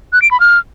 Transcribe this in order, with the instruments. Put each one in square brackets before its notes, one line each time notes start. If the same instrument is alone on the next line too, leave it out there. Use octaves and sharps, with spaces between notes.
[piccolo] F#6
D7
B5
F6